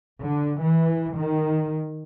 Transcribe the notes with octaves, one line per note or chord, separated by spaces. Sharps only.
D3
E3
D#3